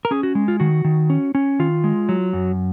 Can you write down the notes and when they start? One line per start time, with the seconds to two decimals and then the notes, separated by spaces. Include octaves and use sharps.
0.05 A#4
0.11 C#4 G#4
0.23 F#4
0.35 G#3
0.48 F4
0.60 D#3 F#4
0.84 D#3
1.10 C#4
1.35 C#4
1.59 D#3 F4
1.84 G#3
2.09 F#3
2.33 F#2